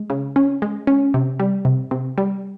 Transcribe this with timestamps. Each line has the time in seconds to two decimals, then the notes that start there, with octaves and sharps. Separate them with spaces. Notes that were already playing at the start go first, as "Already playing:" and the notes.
Already playing: G#3
0.10 C#3
0.36 C#4
0.62 G#3
0.87 C#4
1.14 C3
1.40 G3
1.65 C3
1.91 C3
2.18 G3